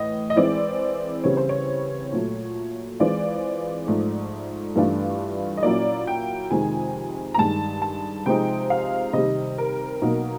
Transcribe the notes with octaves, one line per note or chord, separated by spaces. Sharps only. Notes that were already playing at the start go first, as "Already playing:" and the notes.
Already playing: A2 E3 D#5
D#5
E3 G#3 C4 E4 D5
C#3 E3 G3 C4 C#5
C5
C#5
A#2 F#3 A3
E3 G#3 C4 F4 D5
G#2 F3 A3
G2 E3 A3 D4 F4
D#5
A#2 F#3 A#3 C#4 E4 D5
G5
F2 C3 D#3 G#3 G#5
A#5
G2 D#3 G#3 A5
A5
C3 F3 G#3 C4 D#4 G5
F5
C3 D#3 G3 D#5
A#4
B2 F#3 A#3 D#4